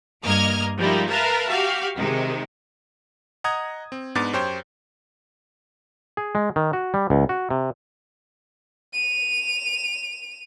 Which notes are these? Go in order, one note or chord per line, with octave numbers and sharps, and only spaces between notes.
G2 A#3 D#5 A#5 F6 G#6
F3 G3 G#3 A#3 D#4 E4
A#4 B4 E5 F5 A5 A#5
F#4 G4 F5
C3 D#3 G#3 D#4
D#5 F#5 A#5 D#6 G#6
C4
G#2 B3 D4 D6 A6
F#2 G4 C5 C#5 G5 G6
G#4
G#3
D#3
F#4
G3
C#2
F#4
C3
D#7 F7